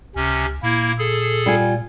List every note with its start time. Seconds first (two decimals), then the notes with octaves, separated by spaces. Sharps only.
0.16 C#2 C3 C#4
0.63 A#2 A#3 E4
0.98 G#4 A4
1.46 G3 F4 G#5